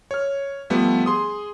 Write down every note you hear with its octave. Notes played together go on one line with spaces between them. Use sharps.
C#5 F6
F3 G3 A3 B3
G#4 C6 D#6